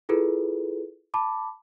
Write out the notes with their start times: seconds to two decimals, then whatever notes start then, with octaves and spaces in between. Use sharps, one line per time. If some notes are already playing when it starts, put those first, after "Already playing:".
0.09 E4 F4 G#4 A4 B4
1.14 A5 B5 D6